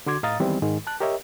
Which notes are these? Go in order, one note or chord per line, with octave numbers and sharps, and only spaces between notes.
D3 F#4 C6 D6 G#6
A2 D#5 F5 A#5 D#6 A6
D#3 E3 G3 G#3 B3 C4
G#2 D#3 G#3
A5 F#6
G4 A#4 C#5 D#5 E5